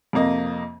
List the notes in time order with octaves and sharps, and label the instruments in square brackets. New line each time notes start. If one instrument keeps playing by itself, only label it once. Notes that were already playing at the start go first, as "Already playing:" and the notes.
[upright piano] F2 C3 A#3 D#5